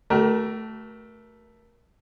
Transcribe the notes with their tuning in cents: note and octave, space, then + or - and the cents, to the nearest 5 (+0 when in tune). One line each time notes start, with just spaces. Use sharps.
A3 +0 F#4 +45 A#4 +25